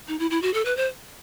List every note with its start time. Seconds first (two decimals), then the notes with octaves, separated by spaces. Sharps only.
0.08 D#4
0.19 E4
0.31 E4
0.42 F#4
0.54 A4
0.65 B4
0.77 C5